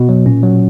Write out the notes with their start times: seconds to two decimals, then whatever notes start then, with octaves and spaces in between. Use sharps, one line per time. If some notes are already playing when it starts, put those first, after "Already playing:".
Already playing: B2
0.09 F#3
0.26 A#2 C#4
0.43 F#3